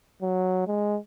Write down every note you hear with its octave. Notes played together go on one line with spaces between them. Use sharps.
F#3
G#3